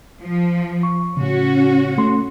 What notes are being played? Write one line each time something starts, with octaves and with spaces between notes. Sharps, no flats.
F3
C#6
A2 C#3 C#4 F#4
A3 C6